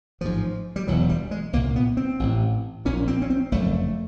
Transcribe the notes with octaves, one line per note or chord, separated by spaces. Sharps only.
A1 G#2 F3
G3
E1 E2 B2 F#3
G3
G#3
C2 A#2 A#3
B3
C4
A1 A2
A#1 A#2 C#4
C4
C#4
C4
F#1 F2 D3 A3